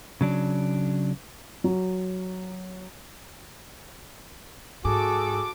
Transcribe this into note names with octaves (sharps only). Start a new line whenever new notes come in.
C#3 F#3 D4
F#3
G#2 F#4 G#4 A4 D6